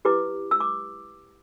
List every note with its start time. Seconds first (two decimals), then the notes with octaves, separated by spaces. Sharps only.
0.05 E4 G4 B4 D6
0.51 E6
0.60 D6